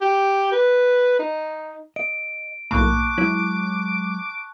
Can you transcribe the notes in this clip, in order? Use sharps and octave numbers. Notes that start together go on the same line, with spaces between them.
G4
B4
D#4
D#5 D7
B1 A2 A#3 A5 B5 C#6 D6 F#6
F#3 G#3 E4 C#5